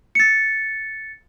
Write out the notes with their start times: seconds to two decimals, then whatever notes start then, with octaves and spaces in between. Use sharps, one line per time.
0.15 A6 C#7